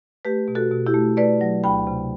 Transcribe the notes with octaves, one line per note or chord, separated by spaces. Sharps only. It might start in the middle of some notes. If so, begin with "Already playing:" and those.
A3 G4 B4
B2
F#4 A4
B2
E4 G4
A3
A3 B4 D5
F#3
D2 G5 B5
C3